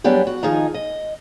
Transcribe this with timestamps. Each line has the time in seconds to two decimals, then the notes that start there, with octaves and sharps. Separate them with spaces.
0.04 F#3 G3 B3 D4 G4 G#4
0.27 F#4
0.43 D#3 F3 D#4 G#4
0.74 D#5